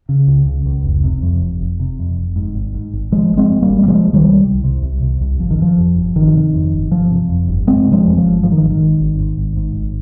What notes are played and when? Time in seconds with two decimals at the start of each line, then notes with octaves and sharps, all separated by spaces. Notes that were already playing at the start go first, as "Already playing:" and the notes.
0.09 C#3
0.28 C#2
0.47 C#3
0.66 C#2
0.85 F1
1.03 C3
1.22 F2
1.41 F1
1.61 F1
1.80 C3
1.99 F2
2.17 F1
2.36 G#2
2.55 G#1
2.74 G#2
2.93 G#1
3.12 G#2 F3 G#3
3.31 G#1
3.37 G#3 C4
3.50 G#2
3.62 G3 A#3
3.69 G#1
3.83 G3
3.88 C3 F3 G#3
4.07 C2
4.14 D#3 G3
4.26 C3
4.44 C2
4.64 C3
4.83 C2
5.02 C3
5.21 C2
5.39 G1 F3
5.51 D#3
5.59 C3
5.62 F3
5.78 F2
5.96 G1
6.15 G1 D#3
6.34 C3
6.54 F2
6.73 G1
6.91 G1 F3
7.10 C3
7.29 F2
7.48 G1
7.67 G1 G#3 C4
7.86 C3
7.92 F3 G#3
8.05 F2
8.17 F3
8.24 G1
8.43 G#2 F3
8.52 D#3
8.62 G#1
8.70 D#3
8.81 G#2
9.00 G#1
9.19 G#2
9.38 G#1
9.57 G#2
9.76 G#1